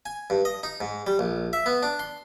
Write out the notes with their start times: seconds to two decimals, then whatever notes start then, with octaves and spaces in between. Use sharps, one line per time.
0.06 G#5
0.30 G2
0.45 D#5
0.63 D#4
0.81 G#2
1.07 G3
1.19 A#1
1.53 E5
1.66 B3
1.83 D4
1.99 C6